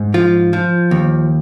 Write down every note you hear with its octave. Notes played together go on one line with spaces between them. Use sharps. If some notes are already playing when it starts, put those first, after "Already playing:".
Already playing: G#2
F3 F4
F3
D#2